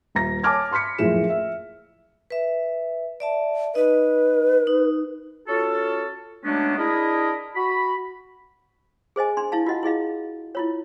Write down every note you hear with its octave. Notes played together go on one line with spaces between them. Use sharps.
D#1 A#5 A#6
C#5 G#5 A5 D6 F6 G#6
B5 C6 F6 B6 C#7
F#1 F2 A2 A3 G#4 E7
E5
B4 E5
D5 E5 A5
D#4 B4 D#5
D#4
C#4 F4 F#4 A4
F#3 G#3 A3 B3 C#4 D4
D4 E4 G#4 A#4 D#5 B5
F#4 B5
G#4 C5 D#5 G#5
D4 C6
E4 F5 A5
F4 F#4 D#5 F#5
E4 G#4 D#5 F5
E4 F4 C#5